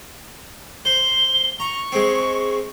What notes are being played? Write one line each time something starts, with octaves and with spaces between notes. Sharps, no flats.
C5 G7
A#5 C#6
G#3 C4